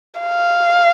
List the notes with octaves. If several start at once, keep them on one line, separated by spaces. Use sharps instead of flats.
F5